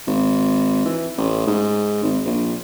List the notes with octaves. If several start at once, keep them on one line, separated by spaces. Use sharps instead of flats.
G#1
E3
A1
G#2
G#1
A#1